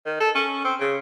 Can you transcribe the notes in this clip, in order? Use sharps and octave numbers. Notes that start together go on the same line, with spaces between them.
D#3
A4
C#4
C4
C#3